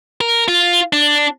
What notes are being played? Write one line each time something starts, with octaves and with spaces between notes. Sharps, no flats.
A#4
F4
D4